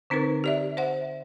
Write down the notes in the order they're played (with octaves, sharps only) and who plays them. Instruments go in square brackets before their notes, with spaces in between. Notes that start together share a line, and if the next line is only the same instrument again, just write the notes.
[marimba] D3 C4 D#4 A#4 B4
G4 D5 E5
C5 E5 F#5